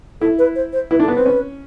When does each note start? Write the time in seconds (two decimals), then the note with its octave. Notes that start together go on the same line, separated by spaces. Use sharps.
0.21 E4 A4
0.39 B4
0.55 C5
0.73 C5
0.91 E4 B4
1.00 D4 A4
1.08 B3
1.14 C4 B4
1.26 C#4